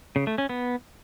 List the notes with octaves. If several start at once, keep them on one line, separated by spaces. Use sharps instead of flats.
C#3
A3
C#4
B3